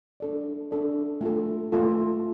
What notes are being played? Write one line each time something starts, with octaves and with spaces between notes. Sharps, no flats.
D4 A4 D5
D4 A4 D5
A3 F4 A4
A3 F4 A4